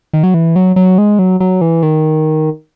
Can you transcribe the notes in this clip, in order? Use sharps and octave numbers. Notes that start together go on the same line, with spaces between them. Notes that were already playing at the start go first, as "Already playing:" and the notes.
D#3
F#3
E3
F#3
F#3
G#3
F#3
F#3
E3
D#3